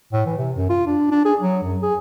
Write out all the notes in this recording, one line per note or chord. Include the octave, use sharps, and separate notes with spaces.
A2
E3
C3
F#2
F4
D4
D4
G#4
F#3
F#2
G#4